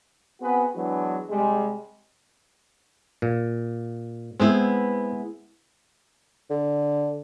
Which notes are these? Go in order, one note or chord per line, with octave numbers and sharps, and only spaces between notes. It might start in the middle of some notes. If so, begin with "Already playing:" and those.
B3 C4 F#4 G#4 B4
E3 F#3 G#3 B3 D4
C3 G3 G#3
A#2
G#3 B3 C4 E4 C5
D3